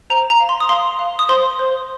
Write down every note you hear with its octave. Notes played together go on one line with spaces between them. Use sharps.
C5 A#5
A#5
F5
C6
D#6
F5 C6
F5
D#6
C5 C6
C5